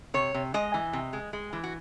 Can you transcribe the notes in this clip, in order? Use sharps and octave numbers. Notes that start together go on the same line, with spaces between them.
C3 C#5
C3
G#3 D#5
E3
C3
G#3
G#3
E3
F#4